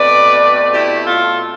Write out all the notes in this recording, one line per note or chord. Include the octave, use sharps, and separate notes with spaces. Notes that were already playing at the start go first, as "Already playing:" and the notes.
Already playing: B2 A3 C4 B4 D5
E4 G4
F4 A4